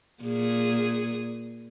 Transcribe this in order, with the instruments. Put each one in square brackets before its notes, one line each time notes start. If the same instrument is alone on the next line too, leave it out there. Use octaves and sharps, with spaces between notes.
[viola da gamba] A#2 G#4